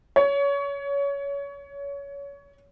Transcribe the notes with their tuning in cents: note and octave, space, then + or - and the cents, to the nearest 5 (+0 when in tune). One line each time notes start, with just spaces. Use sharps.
C#5 +25